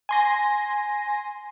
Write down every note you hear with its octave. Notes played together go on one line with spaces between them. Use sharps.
G#5 C6 A#6